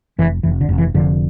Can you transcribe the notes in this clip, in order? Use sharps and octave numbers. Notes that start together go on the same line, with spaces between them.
F1 E3
F1 E3
D3
F1
E3
F1 D3 F3